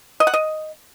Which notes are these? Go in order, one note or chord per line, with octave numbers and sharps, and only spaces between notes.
D#5
F#5
D#5